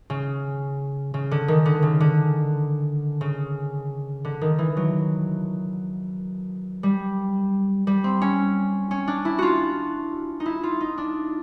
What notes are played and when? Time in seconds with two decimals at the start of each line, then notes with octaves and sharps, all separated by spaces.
0.10 C#3
1.14 C#3
1.31 D3
1.48 D#3
1.66 D3
1.82 C#3
2.00 D3
3.21 C#3
4.25 D3
4.41 D#3
4.58 E3
4.77 F#3
6.83 G3
7.87 G3
8.04 C4
8.22 C#4
8.91 C#4
9.08 D4
9.25 E4
9.39 F4 F#4
10.40 D#4
10.46 E4
10.63 F4
10.81 D#4
10.98 D4